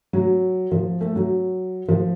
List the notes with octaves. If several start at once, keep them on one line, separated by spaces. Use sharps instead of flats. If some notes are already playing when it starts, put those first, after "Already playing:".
F#3
F3
A3
F#3
F3